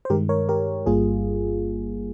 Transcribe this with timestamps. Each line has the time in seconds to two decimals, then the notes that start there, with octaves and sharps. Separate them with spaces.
0.05 C5
0.10 G2 D#3 G#3 G4 A#4
0.29 A#4 C#5
0.49 G4 A#4
0.86 G1 G2 G3 A#3 F4 G#4